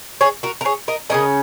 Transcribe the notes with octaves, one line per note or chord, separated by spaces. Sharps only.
G#4 C#5
F#4 A#4
A#4
G#4 C#5
A#4 D#5
C#3 A#3 C#4 A#4 D#5